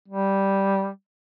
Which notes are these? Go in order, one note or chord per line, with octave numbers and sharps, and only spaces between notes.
G3